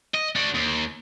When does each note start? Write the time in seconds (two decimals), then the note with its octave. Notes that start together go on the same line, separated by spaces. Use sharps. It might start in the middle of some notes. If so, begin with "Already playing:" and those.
0.14 D#5
0.36 D4 F#4
0.54 D#2